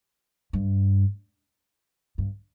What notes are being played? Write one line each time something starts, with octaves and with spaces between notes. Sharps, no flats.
G2
G2